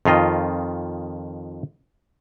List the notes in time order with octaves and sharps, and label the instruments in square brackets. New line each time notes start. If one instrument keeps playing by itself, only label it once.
[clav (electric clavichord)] F2 D#3 F4 D#5